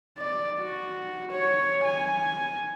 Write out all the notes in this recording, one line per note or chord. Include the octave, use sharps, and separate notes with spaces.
D5
F#4
C#5
G#5